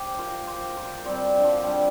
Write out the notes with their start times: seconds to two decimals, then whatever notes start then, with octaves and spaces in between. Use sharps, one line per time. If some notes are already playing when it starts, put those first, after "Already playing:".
Already playing: G4 C5
0.18 F4 A#4
0.47 G4 C5
0.76 F4 A#4
1.05 G3 C4
1.37 D3
1.44 F3
1.63 G3